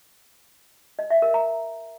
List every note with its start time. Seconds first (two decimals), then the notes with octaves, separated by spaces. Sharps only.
0.99 D#5
1.10 E5
1.22 A#4
1.34 A#5